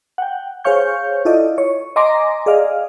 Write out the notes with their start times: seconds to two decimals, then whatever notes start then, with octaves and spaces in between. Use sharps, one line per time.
0.18 F#5 G5
0.64 G#4 C5 C#5 F5 C#6 G6
1.25 E4 F4 A4 D5 D#5
1.58 C#5
1.96 D#5 G#5 A#5 C6 D6 A#6
2.46 G#4 D5 D#5 F5